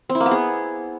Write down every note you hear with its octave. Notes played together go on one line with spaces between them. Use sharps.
C4
E4
A#3
B3
G#4